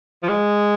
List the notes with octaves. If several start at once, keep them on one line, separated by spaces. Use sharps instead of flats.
F3
G#3